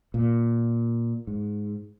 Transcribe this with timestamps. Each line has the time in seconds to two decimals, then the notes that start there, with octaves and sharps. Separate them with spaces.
0.14 A#2
1.27 G#2